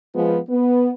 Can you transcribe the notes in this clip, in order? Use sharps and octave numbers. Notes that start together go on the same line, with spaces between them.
F3 G#3 B3
B3